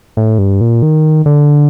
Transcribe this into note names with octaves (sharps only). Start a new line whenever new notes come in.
A2
G2
A#2
D#3
D3